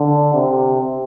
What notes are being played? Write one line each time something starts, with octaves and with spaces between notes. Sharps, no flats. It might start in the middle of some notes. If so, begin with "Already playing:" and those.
Already playing: D3
C3